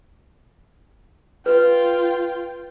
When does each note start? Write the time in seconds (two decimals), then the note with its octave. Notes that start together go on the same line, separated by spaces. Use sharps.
1.46 F4 B4 G5